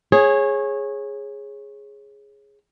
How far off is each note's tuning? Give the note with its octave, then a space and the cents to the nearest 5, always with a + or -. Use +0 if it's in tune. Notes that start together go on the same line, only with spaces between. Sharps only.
G#4 +0 C#5 -20